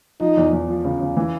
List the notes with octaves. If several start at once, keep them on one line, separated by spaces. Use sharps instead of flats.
F3 D#4
E2
E2
F3
C#3
C#3
E3